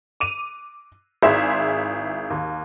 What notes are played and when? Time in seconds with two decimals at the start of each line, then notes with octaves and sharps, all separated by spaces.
0.20 D6 D#7 F7
1.23 G#1 E4 G#4 E5 C6 B6
2.30 D#2